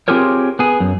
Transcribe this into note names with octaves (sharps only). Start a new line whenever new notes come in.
C4 F4 G4 G#4 A#4 C#5
B3 G#4
F#2